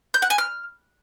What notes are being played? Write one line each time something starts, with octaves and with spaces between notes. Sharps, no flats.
G6
F#5
G#5
F6